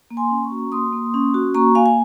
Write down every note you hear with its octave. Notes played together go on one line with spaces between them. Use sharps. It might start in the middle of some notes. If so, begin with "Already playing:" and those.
A#3
G#5 C6
C#4
A#5 C#6
F#4
A#3 C6 D#6
A#3
C#4
F#4
A#3 A#5 C#6
A#3 F5 G#5
G#5